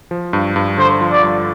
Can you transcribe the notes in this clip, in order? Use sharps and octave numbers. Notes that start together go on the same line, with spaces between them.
F3
G2
G2
D3 C5
F3
D5
G2